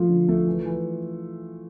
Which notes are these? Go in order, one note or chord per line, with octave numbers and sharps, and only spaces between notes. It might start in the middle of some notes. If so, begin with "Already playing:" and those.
Already playing: F3 A3 F4
D3
A3
E3
E3